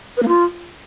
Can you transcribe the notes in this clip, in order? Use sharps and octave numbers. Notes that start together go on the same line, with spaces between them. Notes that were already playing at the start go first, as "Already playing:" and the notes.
B4
A#3
F4